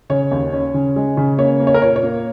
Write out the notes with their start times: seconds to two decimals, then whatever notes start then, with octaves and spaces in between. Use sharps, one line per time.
0.10 C#3 C#5
0.31 D#2
0.53 C#4
0.74 C#3
0.96 G#3
1.17 C#3
1.38 A#3 C#5
1.60 A#3
1.67 C#5
1.74 A#4
1.82 A#2 C#5
1.96 C#5
2.03 A#3